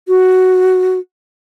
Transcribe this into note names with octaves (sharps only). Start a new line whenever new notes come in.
F#4